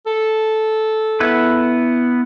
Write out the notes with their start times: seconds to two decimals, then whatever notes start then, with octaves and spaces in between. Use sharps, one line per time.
0.07 A4
1.20 B3 E4 B4